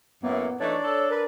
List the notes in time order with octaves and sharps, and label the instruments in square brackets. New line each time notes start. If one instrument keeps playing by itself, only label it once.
[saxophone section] F#2 A2 [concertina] A#3 [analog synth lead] B3
[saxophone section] E3 A3 D#4 [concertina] D4 D5 [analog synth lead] C#5
[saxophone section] A4
[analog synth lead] A#4 [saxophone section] B4